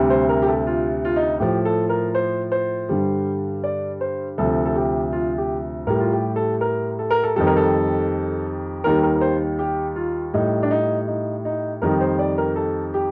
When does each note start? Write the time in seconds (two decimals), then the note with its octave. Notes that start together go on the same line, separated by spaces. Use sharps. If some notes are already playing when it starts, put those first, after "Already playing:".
Already playing: D2 C3 G3
0.10 C5
0.29 A#4
0.42 G4
0.47 A4
0.67 F4
1.05 F4
1.16 D#4
1.40 A2 F3 G4
1.65 A4
1.89 A#4
2.15 C5
2.52 C5
2.89 G2 D3 G3
3.64 D5
4.01 C5
4.38 D2 C3 F3 A4
4.66 A4
4.76 G4
5.12 F4
5.38 G4
5.87 A2 G3 A#4
6.00 F4
6.12 G4
6.36 A4
6.61 A#4
6.99 A4
7.11 A#4
7.23 A4
7.36 F2 D#3 G3 A4
7.47 A#4
7.57 A4
8.84 D#2 D#3 G3 A#4
9.03 A#4
9.16 A#4
9.21 C5
9.59 G4
9.96 F4
10.34 A2 G3 D#4
10.63 D4
10.71 D#4
11.08 D#4
11.45 D#4
11.82 F2 D#3 G3 A#4
12.01 C5
12.19 D5
12.38 A#4
12.56 A4
12.94 G4